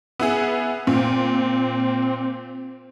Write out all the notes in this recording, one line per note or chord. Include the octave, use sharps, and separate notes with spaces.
B3 E4 G#4
A#2 C4